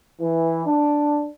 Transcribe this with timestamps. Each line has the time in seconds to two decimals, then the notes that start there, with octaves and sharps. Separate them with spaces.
0.20 E3
0.66 D4